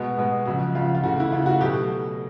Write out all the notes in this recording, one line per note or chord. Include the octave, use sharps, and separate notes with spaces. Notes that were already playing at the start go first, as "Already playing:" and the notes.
Already playing: B2 G#3 B3 F#4
B2 G#3 B3
F2 C#3 F#3 F#4
F2 C#3 F#3 F4
F4
C#3 E3 A3 F#4
E4
C#3 E3 A3 F4
F#4
B2 F#3 A3 G4